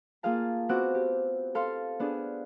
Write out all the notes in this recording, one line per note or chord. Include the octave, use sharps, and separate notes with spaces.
A#3 F4 G#4 F5 A5
B3 C4 F#4 F#5 D6 E6
G4
A4 F5 C6
B3 D4 G#4